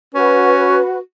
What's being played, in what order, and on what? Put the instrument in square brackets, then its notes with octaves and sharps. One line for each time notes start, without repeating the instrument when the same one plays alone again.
[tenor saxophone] C#4 [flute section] F#4 B4